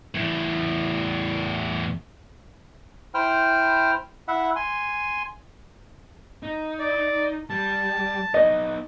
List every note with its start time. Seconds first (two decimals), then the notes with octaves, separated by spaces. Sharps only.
0.15 E2 A2
3.14 E4 C5 G5 F6
4.28 E4 E5 F#5
4.56 G#5 C6
6.43 D#4
6.79 D5
7.50 G3 A5
8.34 B3 D#4 D#5